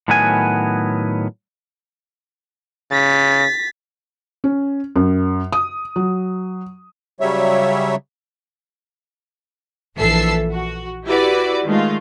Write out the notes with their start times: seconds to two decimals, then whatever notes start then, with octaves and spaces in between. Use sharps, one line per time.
0.08 A2 D#3 F#3 B3 D4 G#5
2.91 C#3 A6 B6
4.44 C#4
4.96 F#2
5.53 D#6
5.96 F#3
7.20 C#3 F#3 G3 C#5 E5
9.96 A#1 E3 A4 E5 E6 C7
10.52 F#4
11.06 E4 F#4 G4 B4 D5
11.66 D#3 G#3 A3 F4